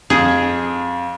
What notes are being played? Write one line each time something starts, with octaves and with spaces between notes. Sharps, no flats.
F2 G#4